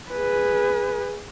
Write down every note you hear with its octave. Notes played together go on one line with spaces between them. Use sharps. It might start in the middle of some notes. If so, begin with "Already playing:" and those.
G#4 B4